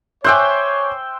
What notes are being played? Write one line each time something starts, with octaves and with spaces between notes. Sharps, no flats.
C5 C#5 E5 G5 G#5 D6 F#6